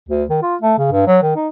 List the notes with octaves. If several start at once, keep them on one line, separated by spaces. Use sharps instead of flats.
D2
D#3
F4
A3
C#3
G2
F#3
D#3
D#4